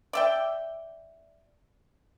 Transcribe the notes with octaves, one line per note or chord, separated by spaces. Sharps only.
D5 E5 G5